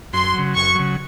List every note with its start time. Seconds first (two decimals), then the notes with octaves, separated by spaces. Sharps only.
0.13 F#2 C6
0.34 C#3 F#3
0.56 F#2 C#6
0.75 C#3 F#3